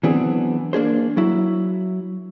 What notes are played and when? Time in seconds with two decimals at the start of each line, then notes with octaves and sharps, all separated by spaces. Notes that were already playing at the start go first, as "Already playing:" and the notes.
0.03 E3 F#3 B3 C4 D4 G#4
0.73 A#3 D4 G#4 C5
1.17 F#3 E4